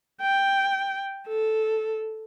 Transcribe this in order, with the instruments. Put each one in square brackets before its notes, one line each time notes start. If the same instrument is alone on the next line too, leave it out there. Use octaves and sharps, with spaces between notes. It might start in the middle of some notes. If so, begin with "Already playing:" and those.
[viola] G5
A4